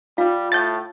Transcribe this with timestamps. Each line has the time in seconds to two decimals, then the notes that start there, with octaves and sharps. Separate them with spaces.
0.18 G3 F4 F5
0.52 A2 G6 A6